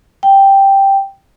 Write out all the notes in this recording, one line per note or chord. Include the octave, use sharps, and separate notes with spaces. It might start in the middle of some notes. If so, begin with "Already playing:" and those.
G5